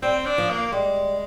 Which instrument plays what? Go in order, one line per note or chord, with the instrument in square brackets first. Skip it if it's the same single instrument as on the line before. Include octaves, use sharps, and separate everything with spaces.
[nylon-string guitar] G3 [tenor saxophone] C4
[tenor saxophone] D4
[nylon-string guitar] F3
[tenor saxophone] A#3
[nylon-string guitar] G3 [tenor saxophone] G#3